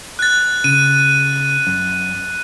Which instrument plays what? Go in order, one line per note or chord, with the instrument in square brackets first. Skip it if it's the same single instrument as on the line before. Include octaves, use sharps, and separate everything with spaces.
[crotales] F#6 A6
[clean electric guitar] C#3 [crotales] D#7
[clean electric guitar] F#2